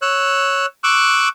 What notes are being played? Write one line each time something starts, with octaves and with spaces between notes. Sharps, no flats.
C#5 E6 F#6
C#6 D6 E6 F#6